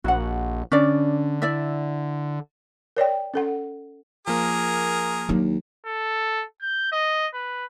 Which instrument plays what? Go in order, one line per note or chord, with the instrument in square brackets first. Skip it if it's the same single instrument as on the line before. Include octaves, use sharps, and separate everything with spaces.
[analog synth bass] A#1 [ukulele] F#4 F#5
[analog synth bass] D3 [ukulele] C#4 D4 D5
[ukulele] E4 D5 E5
[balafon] A#4 C#5 D5 G5
C#4 A4 F#5
[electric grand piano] F3 A#3 [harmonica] G#4 A#4
[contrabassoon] D#2 [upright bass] F#3 D4
[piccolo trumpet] A4
G6
D#5
B4